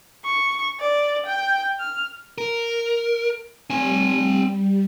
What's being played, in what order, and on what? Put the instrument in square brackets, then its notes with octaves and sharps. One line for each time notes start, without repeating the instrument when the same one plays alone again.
[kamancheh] C#6
D5
G5
F6
[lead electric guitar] A#4
[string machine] G3 [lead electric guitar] C4 G#5